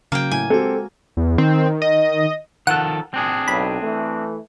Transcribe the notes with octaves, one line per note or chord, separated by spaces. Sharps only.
C#3 F#3 A#3 G5
A2 G#5
G#3 C4 F#4 G4 A4
E2
D#3 C4
D#5
D#3 F3 A4 F#5
C4 D4 G#4
B1 B5
E3 A3